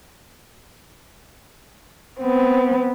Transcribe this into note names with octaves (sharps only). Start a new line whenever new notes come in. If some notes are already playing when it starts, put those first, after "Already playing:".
B3 C4